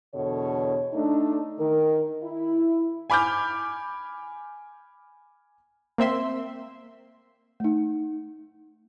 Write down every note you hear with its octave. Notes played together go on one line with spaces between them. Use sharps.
E2 B2 D3 A4 C#5
A3 D4 D#4
D#3 A#4
E4
G#5 B5 D6 F6 G6
A#3 C4 E5 C6
A3 D#4